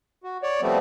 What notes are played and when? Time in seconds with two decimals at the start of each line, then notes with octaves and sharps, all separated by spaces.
0.24 F#4
0.43 C#5 D5
0.62 F3 G3 A3 B3 C4